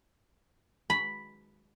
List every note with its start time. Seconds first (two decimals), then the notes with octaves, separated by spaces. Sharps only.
0.90 B5